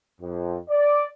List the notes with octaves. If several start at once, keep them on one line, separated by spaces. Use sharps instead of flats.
F2
D5